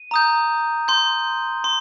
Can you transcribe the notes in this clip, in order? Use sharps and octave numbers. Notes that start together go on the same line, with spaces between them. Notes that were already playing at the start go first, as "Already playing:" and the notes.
Already playing: D#7
A#5 D#6 G6
C6 G6
C6